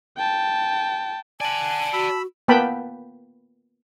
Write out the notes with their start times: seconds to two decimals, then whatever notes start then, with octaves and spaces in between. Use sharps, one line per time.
0.17 G5 A5
1.40 D5 F#5 G#5 A5
1.93 F#4 B5 E6
2.48 A#3 B3 B4 G5 A5 B5